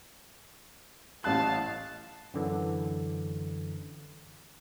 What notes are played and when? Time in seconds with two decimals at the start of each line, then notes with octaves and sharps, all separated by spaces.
1.24 A1 F5 A5 F#6
2.34 F#2 D3 E3